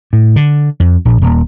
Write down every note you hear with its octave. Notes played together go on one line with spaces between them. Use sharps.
A2
D3
F2
A#1
D#1